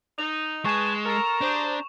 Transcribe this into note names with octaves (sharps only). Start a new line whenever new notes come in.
D#4 F7
G#3 B4 G#5 A5 C#6 E7
A4 A#4 A#5
D4 G4 G#4 C5